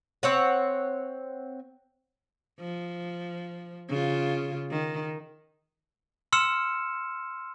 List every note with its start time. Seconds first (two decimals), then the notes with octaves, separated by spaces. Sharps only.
0.23 C4 C#5 F#5
2.59 F3
3.89 C#3 F4
4.70 D#3
6.33 C6 E6 F6 C#7 E7